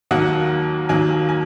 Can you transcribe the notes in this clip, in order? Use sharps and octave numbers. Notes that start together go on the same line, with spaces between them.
D#2 D#3 F#3 A#3 F#5
D#2 D#3 F#3 A#3 G#5
G#5